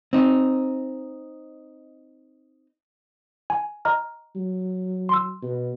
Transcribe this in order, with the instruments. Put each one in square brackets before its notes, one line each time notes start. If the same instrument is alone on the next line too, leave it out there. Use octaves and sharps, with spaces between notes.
[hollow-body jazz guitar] C4 D#4
[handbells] G#5
D#5 A#5 F6
[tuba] F#3
[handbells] C6 E6
[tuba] B2